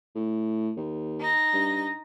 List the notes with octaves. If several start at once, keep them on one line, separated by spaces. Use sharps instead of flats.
A2
D#2
D#4 A#6
G2